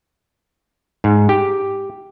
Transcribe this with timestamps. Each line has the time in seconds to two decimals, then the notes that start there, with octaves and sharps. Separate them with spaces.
1.04 G#2
1.29 G4